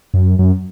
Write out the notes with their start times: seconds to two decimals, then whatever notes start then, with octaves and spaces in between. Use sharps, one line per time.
0.14 F#2
0.39 F#2